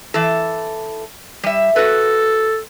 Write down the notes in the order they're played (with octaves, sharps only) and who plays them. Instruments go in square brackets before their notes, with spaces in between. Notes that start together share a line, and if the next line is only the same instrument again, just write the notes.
[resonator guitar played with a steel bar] E3 A4
G3 E5
[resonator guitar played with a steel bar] F#4 B4 [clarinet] A4